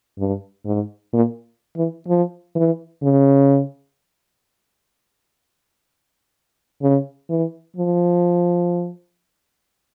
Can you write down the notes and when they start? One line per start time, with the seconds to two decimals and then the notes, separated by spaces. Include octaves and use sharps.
0.19 G2
0.66 G#2
1.13 A#2
1.76 E3
2.08 F3
2.56 E3
3.03 C#3
6.82 C#3
7.30 E3
7.77 F3